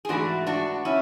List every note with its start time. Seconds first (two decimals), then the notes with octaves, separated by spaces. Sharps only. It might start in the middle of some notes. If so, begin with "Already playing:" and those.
0.05 G#4
0.09 G#2 E3 A3 D4 F#4
0.47 D4 F#4
0.85 C#4 E4